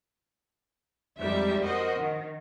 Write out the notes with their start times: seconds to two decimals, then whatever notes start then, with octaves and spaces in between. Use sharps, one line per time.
1.18 F2 G3 G#3 D#4 E5
1.62 F#4 A#4 C5 D#5
1.99 D#3